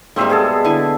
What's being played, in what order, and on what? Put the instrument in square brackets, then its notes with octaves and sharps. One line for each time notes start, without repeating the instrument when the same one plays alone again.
[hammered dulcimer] G#2 C4 E5 [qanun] G3 G#3 A#3
[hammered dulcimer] B2 G#4 A4
[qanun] D3 E4 G#5